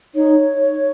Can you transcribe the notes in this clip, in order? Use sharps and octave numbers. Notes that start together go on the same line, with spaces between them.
D#4 C#5